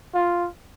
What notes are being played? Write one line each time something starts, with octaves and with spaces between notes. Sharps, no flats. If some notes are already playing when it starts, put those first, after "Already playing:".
F4